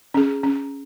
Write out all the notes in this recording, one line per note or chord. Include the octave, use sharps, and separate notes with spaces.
C#4 G#4
C#4